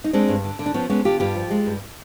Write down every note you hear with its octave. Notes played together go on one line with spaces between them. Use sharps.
D#4
G#3 C4 D4
G2
D3
D3
D4
F3 B3 C#4
G#3 B3 C#4
D3 F4 G4
G2 F4 G4
F3
G#3
G2